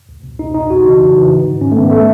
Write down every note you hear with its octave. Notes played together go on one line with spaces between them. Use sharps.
C#2
B2
C#2 D#4
B2 D#4
E2 F#4
C#3 E3 D#4
E2
C#3 E3
G#2
D#3
G#2 C#4
A3
D#3 B3
A3